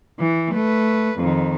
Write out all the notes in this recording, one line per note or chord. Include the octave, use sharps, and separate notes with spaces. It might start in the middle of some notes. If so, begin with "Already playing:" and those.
E3
A3 B4
F2 D#3